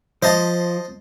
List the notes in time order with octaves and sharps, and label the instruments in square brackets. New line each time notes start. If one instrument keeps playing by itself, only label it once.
[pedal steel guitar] F3 [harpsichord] C5 D#5 A5